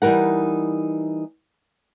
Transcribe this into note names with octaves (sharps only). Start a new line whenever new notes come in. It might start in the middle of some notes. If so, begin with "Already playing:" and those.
E3 G3 D#4 A#4 F#5